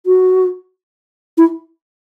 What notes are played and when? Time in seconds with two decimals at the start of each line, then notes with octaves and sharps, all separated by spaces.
0.06 F#4
1.38 E4